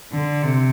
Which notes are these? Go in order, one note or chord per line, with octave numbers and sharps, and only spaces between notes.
D3
C3